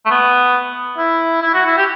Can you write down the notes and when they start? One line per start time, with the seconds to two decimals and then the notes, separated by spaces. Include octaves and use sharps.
0.06 A3
0.11 B3
0.98 E4
1.42 E4
1.54 F#4
1.67 E4
1.78 G4